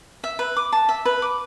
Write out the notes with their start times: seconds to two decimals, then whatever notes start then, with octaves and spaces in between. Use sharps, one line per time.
0.24 E5
0.39 B4
0.57 D6
0.73 A5
0.89 E5
1.05 B4
1.22 D6